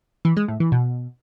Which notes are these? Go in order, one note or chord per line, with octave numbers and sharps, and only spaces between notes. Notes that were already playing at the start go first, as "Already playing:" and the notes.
E3
G#3
A2
E3
B2